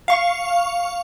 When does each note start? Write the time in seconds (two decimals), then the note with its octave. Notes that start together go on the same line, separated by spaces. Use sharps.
0.08 F5 C#6